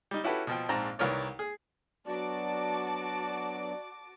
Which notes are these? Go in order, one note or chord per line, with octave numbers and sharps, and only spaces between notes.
G3 D#4
C#4 E4 F#4 G4 A4 B4
B2 F3 G5
A#1 G#2 C4 A5 A#5
C2 D#3 A#4 B4 C#5 D5
G#4
F#3 B3 D4 F#4 D5 A5 D6